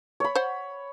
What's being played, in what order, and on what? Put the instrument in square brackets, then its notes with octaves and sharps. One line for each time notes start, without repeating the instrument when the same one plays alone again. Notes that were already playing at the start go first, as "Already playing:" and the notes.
[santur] C#5 B5
[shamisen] C5 F#5